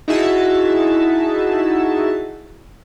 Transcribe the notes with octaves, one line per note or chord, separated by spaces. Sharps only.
D#4 E4 F#4 G#4 E5 A5